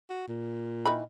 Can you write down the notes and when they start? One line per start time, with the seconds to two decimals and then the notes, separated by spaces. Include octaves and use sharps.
0.10 F#4
0.28 A#2
0.85 D#3 E3 B5